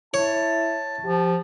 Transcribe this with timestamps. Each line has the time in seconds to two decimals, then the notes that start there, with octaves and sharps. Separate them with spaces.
0.14 E4 C#5 A5
1.04 F3 G4